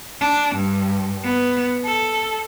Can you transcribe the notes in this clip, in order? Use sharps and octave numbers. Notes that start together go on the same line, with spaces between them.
D4
G2
B3
A4